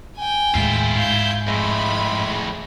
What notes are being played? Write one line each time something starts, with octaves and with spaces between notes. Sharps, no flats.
G5 G#5
D#2 A2 G#3 E4 F4
G#2 F5 G#5 G6
F2 A2 G#3 E5 B5